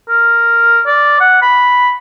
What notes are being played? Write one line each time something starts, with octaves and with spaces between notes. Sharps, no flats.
A#4
D5
F#5
B5